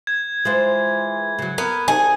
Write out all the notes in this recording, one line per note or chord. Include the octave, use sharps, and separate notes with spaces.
G#6
E3 G#3 F4 C5
C#3 F#3
B3 A#4
C2 D#4 G#4